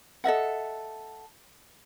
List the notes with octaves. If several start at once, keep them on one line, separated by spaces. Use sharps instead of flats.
A4 D#5 E5 F#5